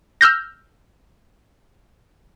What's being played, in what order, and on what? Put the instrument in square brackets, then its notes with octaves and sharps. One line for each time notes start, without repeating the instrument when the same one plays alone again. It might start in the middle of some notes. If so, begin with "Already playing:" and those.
[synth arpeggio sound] E6 F6 G6 A#6